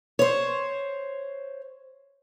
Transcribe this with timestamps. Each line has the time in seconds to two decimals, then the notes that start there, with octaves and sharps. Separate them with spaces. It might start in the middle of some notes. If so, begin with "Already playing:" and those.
0.19 C5 C#5